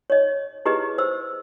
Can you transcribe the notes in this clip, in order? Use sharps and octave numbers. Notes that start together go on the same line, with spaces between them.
C#5 D#5
E4 G4 G#4 B4 D#5
C5 E6